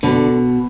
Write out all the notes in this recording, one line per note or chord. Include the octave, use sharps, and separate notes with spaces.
B2 D3